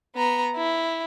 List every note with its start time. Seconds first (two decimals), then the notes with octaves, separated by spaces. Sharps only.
0.15 B3 A#5
0.56 E4